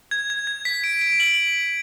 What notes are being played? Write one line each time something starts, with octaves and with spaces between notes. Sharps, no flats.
G#6
G#6
G#6
B6
D7
D7
F#7